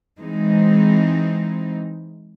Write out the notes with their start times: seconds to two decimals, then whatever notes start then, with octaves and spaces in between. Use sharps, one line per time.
0.19 E3 G#3 C4 D#4